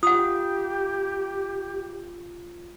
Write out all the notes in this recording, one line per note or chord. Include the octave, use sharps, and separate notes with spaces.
F4 G4 F#5 D#6